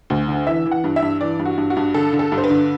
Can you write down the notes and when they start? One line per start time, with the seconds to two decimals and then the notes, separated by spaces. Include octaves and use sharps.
0.10 D2
0.28 D3
0.47 E3 E5
0.66 E3
0.71 F#5
0.84 G2
0.96 E5
1.02 G2
1.21 E3 D5
1.39 G2
1.45 F#4
1.58 G2
1.70 F#4
1.77 G2
1.94 D3 A4
2.13 D3
2.19 A4
2.32 G2
2.38 C5
2.44 B4
2.50 D3